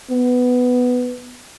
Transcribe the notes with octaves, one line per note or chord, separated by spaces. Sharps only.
B3